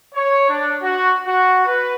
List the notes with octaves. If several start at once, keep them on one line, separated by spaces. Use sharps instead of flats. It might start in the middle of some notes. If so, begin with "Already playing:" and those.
C#5
D4
F#4
F#4
B4